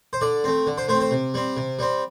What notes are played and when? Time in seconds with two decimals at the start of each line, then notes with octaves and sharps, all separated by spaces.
0.13 C5
0.21 D3 D5
0.44 A3 C4
0.66 D3
0.78 C5
0.88 A3 C5
0.93 C4
1.00 C5
1.11 C3
1.34 G3 C4
1.57 C3
1.79 G3 C4